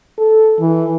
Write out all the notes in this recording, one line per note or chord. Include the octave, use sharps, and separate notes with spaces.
A4
E3